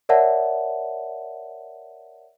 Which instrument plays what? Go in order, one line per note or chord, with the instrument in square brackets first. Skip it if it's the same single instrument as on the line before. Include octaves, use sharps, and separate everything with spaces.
[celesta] A#4 C#5 D5 E5 F#5 A5